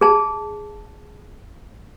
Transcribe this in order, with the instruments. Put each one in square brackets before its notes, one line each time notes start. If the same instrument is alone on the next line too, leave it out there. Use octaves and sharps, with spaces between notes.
[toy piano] G#4 A5